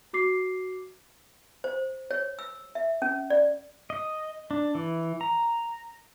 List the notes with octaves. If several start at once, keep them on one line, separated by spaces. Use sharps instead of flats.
F#4 D6 C7
C5
C#5
E6
E5
C#4
D5
D#5
D4
E3
A#5